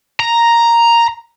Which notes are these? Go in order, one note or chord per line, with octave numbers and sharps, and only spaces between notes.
A#5